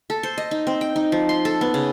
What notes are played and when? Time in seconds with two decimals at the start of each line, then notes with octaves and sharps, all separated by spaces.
0.10 A4
0.23 C5
0.38 D#5
0.51 D#4
0.67 C4
0.81 G5
0.96 D#4
1.12 F3
1.29 C6
1.45 A4
1.61 B3
1.74 C#3